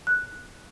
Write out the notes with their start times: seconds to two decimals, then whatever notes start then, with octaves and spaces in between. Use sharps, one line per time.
0.07 F#6